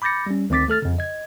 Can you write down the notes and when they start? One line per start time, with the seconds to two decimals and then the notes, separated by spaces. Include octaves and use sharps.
0.02 B5 D6 G6 A6 A#6 C#7
0.26 G3 C#4
0.50 D2 D#3 C4 D6 A6 B6
0.68 A3 A4 F6 A6
0.82 F2 C#3
0.98 D#5 G#6